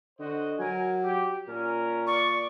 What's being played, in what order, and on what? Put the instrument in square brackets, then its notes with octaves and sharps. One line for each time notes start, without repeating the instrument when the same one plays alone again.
[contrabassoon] D3 [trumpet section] F#4 C5 D#5
[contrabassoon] F#3 [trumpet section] A#4 G#5
[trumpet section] G4
[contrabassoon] A#2 [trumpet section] C#4 A#4
[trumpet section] D5 [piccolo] C#6